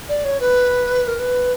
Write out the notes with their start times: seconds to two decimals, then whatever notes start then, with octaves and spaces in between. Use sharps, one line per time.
0.08 D5
0.24 C#5
0.40 B4
1.07 A#4
1.18 B4